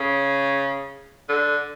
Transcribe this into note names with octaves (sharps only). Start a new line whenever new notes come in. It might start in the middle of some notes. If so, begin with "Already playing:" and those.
Already playing: C#3
D3